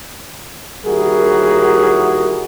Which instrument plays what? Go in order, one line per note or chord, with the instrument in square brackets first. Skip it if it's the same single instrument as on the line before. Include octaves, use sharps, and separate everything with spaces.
[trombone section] D#2 G3 E4 F#4 G#4 A#4